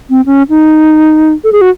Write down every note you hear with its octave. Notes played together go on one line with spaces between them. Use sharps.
C4
C#4
D#4
A4
G#4
F#4